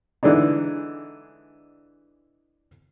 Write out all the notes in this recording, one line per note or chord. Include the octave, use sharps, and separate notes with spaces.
D3 E3 G#3 D4 D#4